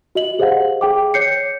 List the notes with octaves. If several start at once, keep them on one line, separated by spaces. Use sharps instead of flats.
F#4 D#5 F#7
G4 G#4 C5 D#5 F5 F#5
G#4 G5 D6
C#5 G6 C7 C#7